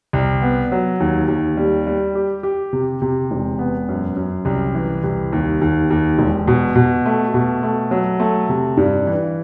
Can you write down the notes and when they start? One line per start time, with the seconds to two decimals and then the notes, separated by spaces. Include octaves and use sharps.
0.13 C2
0.42 B3
0.72 F#3
1.00 D#2
1.28 D#2
1.57 G3
1.87 G3
2.15 G4
2.43 G4
2.73 C3
3.02 C3
3.31 E1
3.59 B3
3.89 F#2
4.16 F#2
4.45 C2
4.74 E3
5.04 C2
5.32 D#2
5.61 D#2
5.90 D#2
6.19 E1
6.48 B2
6.76 B2
7.06 A3
7.34 B2
7.63 A3
7.91 F#3
8.20 A3
8.49 C3
8.77 G2
9.06 E3